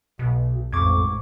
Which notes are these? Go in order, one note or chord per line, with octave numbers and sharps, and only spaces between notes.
B1 B2
A1 F2 G#2 C#6 D6 G#6